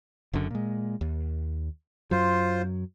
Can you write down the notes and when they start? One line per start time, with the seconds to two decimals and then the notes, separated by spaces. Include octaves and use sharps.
0.33 F#1 F#2 D3
0.50 A#2 G#3
1.01 D#2
2.11 F#2 F#3 F4 C5